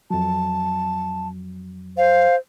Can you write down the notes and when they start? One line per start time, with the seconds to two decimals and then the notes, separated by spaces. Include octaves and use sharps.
0.10 F2 F#3 A5
1.97 C5 F5